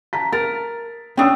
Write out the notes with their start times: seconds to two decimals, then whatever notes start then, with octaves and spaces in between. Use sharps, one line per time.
0.13 A5 A#5 B6
0.33 A#4 A6
1.17 C#4 D4 G5 D#6 E6